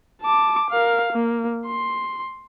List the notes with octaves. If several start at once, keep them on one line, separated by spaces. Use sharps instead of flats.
A5 D6
A#4 F5
A#3
C6